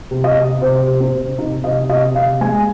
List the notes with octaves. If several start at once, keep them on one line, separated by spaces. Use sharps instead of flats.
C3
D#5
C3
C3 C5
C3
C4
C3
C3 D#4
C3 D#5
C3 D#5
C3 F5
G#3 G#5